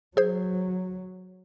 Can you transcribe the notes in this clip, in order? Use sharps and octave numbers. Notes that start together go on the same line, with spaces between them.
F#3 G#4 C5